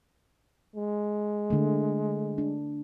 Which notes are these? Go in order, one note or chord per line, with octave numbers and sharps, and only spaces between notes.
G#3
D3 A3
D4